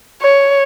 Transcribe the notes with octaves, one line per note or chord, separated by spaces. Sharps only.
C#5